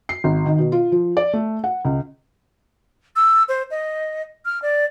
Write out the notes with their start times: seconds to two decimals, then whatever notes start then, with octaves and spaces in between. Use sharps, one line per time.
0.09 C7
0.24 G#1
0.46 D#3
0.58 B2
0.72 F4
0.92 F3
1.17 D5
1.33 A3
1.64 F#5
1.85 C#2
3.16 E6
3.49 C5
3.71 D#5
4.45 F6
4.62 D5